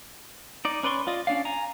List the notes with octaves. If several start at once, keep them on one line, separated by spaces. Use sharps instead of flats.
D#4 D5
C#4 B4 D5 C6 C#6
F4 D5 D#5
C#4 D4 D5 F5
G#5 A#5